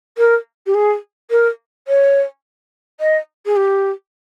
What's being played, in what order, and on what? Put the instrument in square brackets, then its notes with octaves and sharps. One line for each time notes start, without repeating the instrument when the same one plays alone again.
[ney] A#4
G4
G#4
A#4
C#5
D#5
G#4
G4